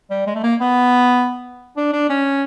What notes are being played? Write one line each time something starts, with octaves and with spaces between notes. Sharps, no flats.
G3
G#3
A3
A#3
B3
D4
D4
C#4